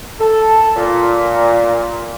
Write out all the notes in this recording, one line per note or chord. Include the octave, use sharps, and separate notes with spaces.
A4
A#2